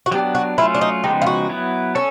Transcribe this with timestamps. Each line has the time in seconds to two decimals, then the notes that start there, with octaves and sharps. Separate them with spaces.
0.06 F#4
0.11 F#3 B3 D4 G4
0.35 F#4
0.58 F#3 A3 C#4 E4 F4
0.75 D4
0.81 D#4
1.04 C#3 F3 G#3 B3 D#4 G4
1.22 F4
1.26 F#4
1.49 F#3 B3 E4
1.95 C#4 A4